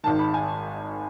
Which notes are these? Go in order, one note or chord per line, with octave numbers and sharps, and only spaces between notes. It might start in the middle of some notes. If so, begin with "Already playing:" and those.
G#1 G#2 D#3 A5
B5
G#5